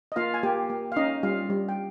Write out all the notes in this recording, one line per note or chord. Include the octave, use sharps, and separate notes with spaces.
D#5
A#3 F4 F5
G#5
A#3 G4 G5
A#3
F5
C#4 D#4 D#5
G3 F4 F5
G3
G5